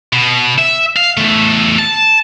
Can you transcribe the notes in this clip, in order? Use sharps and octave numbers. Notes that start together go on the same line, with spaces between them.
B2
E5
F5
E2 A3
A5